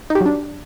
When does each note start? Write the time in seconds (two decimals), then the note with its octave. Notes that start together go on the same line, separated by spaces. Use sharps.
0.10 D#4
0.15 G4
0.20 F#3
0.26 D4